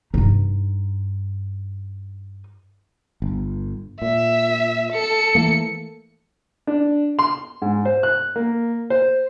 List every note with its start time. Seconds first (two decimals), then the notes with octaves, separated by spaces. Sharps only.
0.14 G2 D#4
3.22 G1
4.02 A#2 E5
4.93 A4 C#7
5.35 E3 A3 A#3
6.67 D4
7.19 C6
7.62 G#2
7.85 C5
8.03 F#6
8.36 A#3
8.90 C5